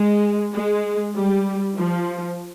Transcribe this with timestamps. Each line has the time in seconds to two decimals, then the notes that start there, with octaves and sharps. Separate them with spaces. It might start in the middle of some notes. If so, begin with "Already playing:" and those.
Already playing: G#3
0.54 G#3
1.15 G3
1.77 F3